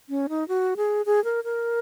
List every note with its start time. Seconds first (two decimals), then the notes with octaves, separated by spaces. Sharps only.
0.09 C#4
0.29 D#4
0.48 F#4
0.77 G#4
1.06 G#4
1.24 A#4
1.44 A#4